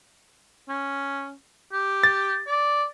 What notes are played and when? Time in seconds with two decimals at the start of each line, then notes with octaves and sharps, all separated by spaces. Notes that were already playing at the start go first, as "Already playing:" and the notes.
0.69 C#4
1.72 G4
2.03 A6
2.47 D5